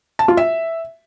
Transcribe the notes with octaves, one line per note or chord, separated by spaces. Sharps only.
A5
F4
E5